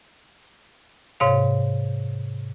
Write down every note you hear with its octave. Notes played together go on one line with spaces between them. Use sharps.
G#2 C3 C#5 F5